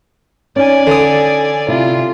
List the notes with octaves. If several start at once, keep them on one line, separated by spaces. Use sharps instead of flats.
C#4 D#4 D5 G#5
D3 D#6
C3 E4 F4